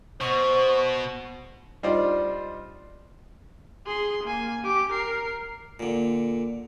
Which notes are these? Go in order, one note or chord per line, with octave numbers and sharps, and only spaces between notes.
B2 C5 C#6
G3 D4 D#4 F4 C5 D5
G#4 C6
A#3 G#5
G4 D6
A#4 C7
A#2 D3